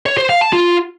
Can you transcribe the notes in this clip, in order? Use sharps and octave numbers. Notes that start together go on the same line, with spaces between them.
C#5
C5
F5
A5
F4